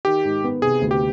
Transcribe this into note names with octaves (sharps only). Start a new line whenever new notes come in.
D#3 G4
G#2
B3
C3 G#4
D2
G4